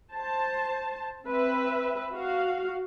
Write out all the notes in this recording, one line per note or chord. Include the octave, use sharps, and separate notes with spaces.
C5 A5
C4 B4 E5
F#4 F5